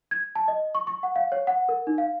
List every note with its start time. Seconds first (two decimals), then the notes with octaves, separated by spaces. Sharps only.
0.11 G#6
0.35 A5
0.48 D#5
0.75 C#6
0.87 C#6
1.03 F#5
1.16 F5
1.32 C#5
1.47 F#5
1.69 A#4
1.87 D#4
1.98 F5